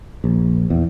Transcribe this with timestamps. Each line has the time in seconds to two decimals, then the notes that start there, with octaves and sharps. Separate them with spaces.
0.24 A#1
0.70 E2